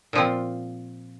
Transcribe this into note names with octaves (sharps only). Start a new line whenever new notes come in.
A#2 F3 C4